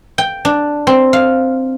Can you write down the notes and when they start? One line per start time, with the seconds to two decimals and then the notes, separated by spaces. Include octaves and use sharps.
0.18 G5
0.45 D4
0.87 C4
1.13 F5